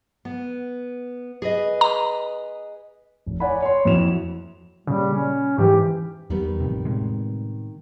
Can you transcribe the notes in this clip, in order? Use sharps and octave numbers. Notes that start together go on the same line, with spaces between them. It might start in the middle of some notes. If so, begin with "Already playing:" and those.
B3
G#4 B4 D#5
A#5
F1
C#5 D5 F#5 G#5 B5
C#5 C6
F2 E4 F#4 E7 F7
A#2 C#3 G3
C#4
G#2 E3 G4
E2 D#3 G3 B3
A1 F2 C3
A2 C3 G#3